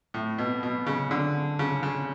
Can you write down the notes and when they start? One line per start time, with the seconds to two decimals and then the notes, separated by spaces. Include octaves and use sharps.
0.14 A2
0.38 B2
0.63 B2
0.87 C#3
1.11 D3
1.59 C#3
1.83 C#3